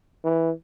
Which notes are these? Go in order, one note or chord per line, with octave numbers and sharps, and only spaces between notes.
E3